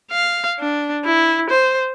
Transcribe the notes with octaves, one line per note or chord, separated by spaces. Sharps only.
F5
D4
E4
C5